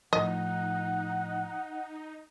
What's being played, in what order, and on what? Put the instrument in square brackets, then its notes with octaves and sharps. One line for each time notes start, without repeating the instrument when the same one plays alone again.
[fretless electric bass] A2 F3 [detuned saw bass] D#4 [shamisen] D#5 [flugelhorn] F#5